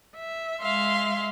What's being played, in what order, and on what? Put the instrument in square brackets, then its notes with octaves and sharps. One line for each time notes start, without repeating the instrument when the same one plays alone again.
[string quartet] E5
G#3 E5 F5 C6